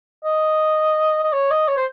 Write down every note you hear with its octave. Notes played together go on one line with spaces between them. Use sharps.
D#5
D#5
C#5
D#5
C#5
C5